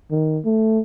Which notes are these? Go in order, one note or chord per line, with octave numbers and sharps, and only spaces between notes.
D#3
A3